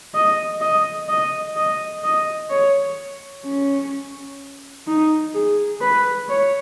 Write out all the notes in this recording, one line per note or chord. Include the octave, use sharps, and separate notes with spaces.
D#5
D#5
D#5
D#5
D#5
C#5
C#4
D#4
G#4
B4
C#5